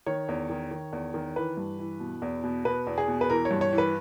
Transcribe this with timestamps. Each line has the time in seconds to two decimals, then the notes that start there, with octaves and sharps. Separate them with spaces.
0.06 D#3 C#5
0.29 E2
0.50 D#3
0.71 D#3
0.93 E2
1.14 D#3
1.36 E3 B4
1.57 G2
1.79 E3
2.00 B2
2.22 E2
2.44 B2
2.65 B2 B4
2.87 E2
2.98 G#4
3.08 B2
3.21 B4
3.30 E3 A#4
3.45 C#5
3.51 G2
3.61 C#5
3.73 E3
3.78 B4